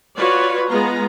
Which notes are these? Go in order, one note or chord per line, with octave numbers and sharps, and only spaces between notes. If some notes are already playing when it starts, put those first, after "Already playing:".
F4 F#4 B4 C#5 D5
G#3 B3 F4 A#5